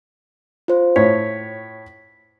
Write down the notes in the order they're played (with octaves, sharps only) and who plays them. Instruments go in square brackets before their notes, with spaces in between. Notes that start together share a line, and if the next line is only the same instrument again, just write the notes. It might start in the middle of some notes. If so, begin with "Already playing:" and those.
[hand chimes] F4 C5
[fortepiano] A2 C#5 [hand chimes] B6